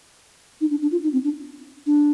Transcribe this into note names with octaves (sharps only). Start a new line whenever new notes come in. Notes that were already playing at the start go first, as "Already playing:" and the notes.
D#4
D4
D4
F4
D#4
C4
D4
D4